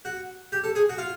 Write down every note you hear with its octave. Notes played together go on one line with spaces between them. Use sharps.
F#4
G4
A4
G#4
F#4
F4